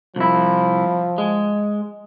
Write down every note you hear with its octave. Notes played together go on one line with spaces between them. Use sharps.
C2 F3 E4
G#3